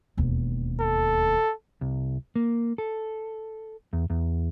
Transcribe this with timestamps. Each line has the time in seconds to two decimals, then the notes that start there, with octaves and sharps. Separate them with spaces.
0.17 E1 D#2
0.81 A4
1.81 C2
2.36 A#3
2.78 A4
3.93 E2
4.10 E2